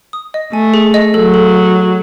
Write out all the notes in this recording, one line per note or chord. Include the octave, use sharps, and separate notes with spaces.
D#6
D#5
A3 G#5
G#4
D#5
F#3 A4
A4